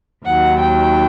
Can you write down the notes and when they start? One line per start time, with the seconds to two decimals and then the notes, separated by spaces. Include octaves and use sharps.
0.24 D#2 D#3 F#3 F#5
0.59 G5